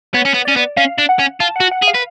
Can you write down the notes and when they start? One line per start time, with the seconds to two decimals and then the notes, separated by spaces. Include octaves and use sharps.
0.14 B3 C#5
0.25 C#4
0.34 B3
0.45 C#4 D5
0.56 B3
0.77 C#4 F5
0.98 D4
1.09 F#5
1.19 C#4
1.40 F4 A5
1.56 F#5
1.60 F#4
1.71 F#5
1.83 G#4
1.88 F5
1.95 B4